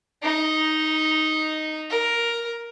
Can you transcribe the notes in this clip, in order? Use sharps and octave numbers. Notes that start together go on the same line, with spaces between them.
D#4
A#4